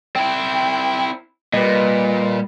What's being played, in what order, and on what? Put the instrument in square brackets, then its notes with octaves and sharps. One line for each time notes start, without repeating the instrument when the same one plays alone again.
[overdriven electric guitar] C4 E4 [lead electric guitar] G5
[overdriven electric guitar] A#2 [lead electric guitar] G3 [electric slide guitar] B4 D#5